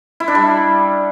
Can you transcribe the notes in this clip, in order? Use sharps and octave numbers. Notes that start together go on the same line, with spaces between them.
E4
D4
G3